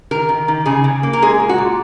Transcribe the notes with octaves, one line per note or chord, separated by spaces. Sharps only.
D#3 A#4
D#3
D#3
C#3 G#4
C#3
A#3
A#4
G#3 G#4
A#2
F#4
A#2